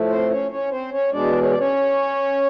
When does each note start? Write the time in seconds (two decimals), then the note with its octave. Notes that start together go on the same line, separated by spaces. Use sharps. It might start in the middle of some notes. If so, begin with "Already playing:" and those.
Already playing: A2 F3 A3
0.10 C4 C5
0.31 C#4 C#5
0.51 C#4 C#5
0.71 C4 C5
0.91 C#4 C#5
1.12 E2 B2 G#3 D4 D5
1.43 C#5
1.51 D5
1.59 C#4 C#5